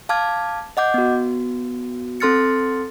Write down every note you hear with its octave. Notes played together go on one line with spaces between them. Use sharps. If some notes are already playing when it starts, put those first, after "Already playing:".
F5 A5 D6 F6 G#6
D#5 F#5 D6 G6
B3 F#4
C4 A4 C6 F6 A6 C#7